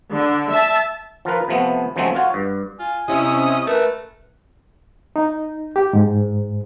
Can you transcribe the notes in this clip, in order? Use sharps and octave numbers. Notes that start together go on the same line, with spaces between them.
D3
E5 A5
F3 F4 A#4 B4
C3 F3 A3 B3
C#3 F3 F#3 G#3 A3 C4
F4 F#4 C#5
G2
F4 G#5
C3 C#4 E4 D#5 D#6
A3 A#4 B4
D#4
G4
G#2